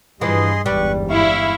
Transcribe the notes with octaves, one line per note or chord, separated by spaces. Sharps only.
G2 E3 F3 G#4 D#5 C6
G1 E2 G#2 G3 B4 C#6
E4 F5 C#6